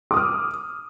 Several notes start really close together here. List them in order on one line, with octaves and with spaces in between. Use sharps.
D6 D#6 F6